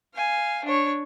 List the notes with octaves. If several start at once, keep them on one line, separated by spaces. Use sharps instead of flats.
F5 G#5
D4 C#5